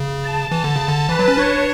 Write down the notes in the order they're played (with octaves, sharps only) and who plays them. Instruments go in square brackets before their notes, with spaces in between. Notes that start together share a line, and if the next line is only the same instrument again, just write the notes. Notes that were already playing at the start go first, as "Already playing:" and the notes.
Already playing: [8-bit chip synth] C#3
[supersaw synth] A5
[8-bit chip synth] E3
D3
[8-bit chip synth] C#3 [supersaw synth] A5
[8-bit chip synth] D3
[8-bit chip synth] E3 [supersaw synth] B4
[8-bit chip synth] F#3
C#4
[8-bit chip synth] D4 [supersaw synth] C#5